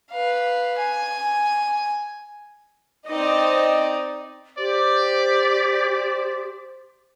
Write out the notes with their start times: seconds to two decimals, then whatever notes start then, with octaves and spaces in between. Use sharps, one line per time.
0.11 B4 F5
0.78 G#5
3.08 C4 D#4 D5 D#5
4.58 G4 C5 D5